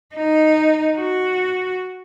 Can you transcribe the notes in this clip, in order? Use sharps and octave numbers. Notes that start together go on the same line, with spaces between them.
D#4
F#4